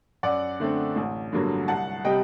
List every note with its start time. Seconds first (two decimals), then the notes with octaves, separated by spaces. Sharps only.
0.23 F#2 D5 F#5
0.60 D3 A3 C4
0.96 A1
1.32 G2 D3 F#3 A#3
1.68 C2 F#5 A5
2.05 C3 G3 D#5 G5